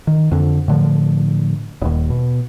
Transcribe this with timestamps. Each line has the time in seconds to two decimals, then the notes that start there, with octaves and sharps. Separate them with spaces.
0.07 D#3
0.31 F2 D3
0.68 A2 D3 F3
1.82 D#1 D#2
2.10 B2